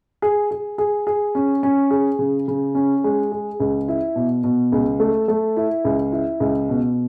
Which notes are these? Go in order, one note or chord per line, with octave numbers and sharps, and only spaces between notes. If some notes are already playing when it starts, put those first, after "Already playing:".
G#4
G#4
G#4
G#4
C#4
C#4
G#4
C#3
C#3
C#4
G#3
G#4
C#2
E4
B2
B2
C#2
A3
A3
E4
C#2
E4
C#2
B2